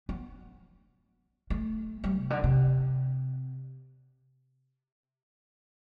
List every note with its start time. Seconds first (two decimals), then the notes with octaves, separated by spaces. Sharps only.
0.09 B3
1.50 A3
2.04 G3
2.17 C3
2.30 D3
2.44 C3